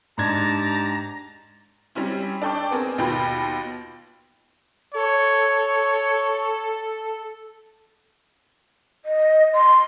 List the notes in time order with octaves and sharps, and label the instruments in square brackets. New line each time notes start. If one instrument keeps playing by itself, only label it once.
[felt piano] G#2 D4 G#6 [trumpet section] G4 A5 [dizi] A#5
[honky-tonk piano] G3 C4 C#4 E4
D4 A4 G5 C#6 D6
B3 C4 G#4 A#4
D#2 B2 F4 G5 B5
[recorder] A4 [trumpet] C#5
[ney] D#5
C6